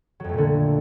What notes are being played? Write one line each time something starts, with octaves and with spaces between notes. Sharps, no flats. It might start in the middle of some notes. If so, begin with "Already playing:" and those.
F2 A#2 D3 F#3 A3